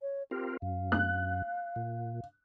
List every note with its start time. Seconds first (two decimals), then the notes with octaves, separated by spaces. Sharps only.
0.02 C#5
0.31 C4 F4 G4 A#4
0.62 F#2 F5
0.92 F#6
1.76 A#2